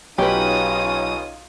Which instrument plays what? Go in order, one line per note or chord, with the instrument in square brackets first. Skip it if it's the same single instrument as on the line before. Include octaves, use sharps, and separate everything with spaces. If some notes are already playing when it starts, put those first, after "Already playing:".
[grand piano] B1 [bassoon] C#4 [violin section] D#4 F4 D#6 [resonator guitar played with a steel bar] G4 B4